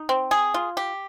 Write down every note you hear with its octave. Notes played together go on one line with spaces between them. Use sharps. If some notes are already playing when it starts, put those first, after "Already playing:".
Already playing: D#4
C4
G#4
F4
G4